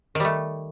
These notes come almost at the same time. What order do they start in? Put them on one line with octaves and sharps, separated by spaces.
D#3 G3 A3